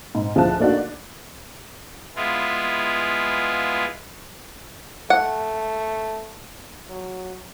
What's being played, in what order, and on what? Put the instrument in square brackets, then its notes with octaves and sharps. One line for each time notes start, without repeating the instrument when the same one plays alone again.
[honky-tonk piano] G#2
D2 F3 G#4 E5 A5 F#6
A3 A#3 D4 D#4 F#4
D5
[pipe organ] G#3 B3 E4 F4
[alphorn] A3 [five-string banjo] F#5
[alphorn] F#3